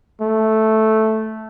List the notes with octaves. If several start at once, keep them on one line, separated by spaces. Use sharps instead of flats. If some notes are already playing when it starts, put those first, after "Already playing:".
A3